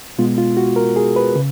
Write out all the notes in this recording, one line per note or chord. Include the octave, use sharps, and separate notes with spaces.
B2 G#3 B3 F4
F4
F#4
A#4
G#4
B4
C#3